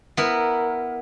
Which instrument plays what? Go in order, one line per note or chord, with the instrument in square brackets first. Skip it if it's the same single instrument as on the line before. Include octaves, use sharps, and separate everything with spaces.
[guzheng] B3 E4 A#4